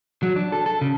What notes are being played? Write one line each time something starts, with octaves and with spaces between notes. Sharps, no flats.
F#3
D4
A4
A4
C#3